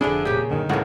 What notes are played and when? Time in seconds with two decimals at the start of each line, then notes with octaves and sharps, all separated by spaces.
0.01 F1 D3 F3 C4 D4 E4 G#4
0.25 A#2 C#3 G4
0.50 F#2 D3 D#3
0.69 C#2 A2 C#3 B3 F#4